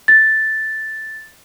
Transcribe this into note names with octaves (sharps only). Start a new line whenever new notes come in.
A6